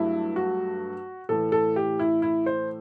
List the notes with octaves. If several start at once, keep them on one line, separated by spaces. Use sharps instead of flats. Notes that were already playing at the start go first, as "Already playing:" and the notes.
Already playing: G2 F#3 A3 E4
F#4
A2 E3 A3 A4
A4
G4
E4
E4
C5